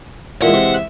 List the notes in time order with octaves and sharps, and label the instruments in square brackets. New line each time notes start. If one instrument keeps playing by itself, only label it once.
[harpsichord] A#2 [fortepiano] E3 G#3 [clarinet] E5 [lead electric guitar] F#5
[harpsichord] C3